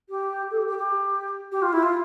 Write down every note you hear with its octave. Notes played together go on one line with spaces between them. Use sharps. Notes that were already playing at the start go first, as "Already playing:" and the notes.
G4
A4
G4
G4
G4
G4
F4
E4
F4